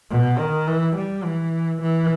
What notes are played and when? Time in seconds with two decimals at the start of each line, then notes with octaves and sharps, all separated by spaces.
0.10 B2
0.38 D#3
0.67 E3
0.96 G3
1.24 E3
1.82 E3